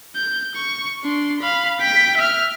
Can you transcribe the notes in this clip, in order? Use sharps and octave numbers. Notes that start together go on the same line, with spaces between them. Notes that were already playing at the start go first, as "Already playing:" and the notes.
G6
C#6
D4 C6
F5 B5
G5 B6
E5 F6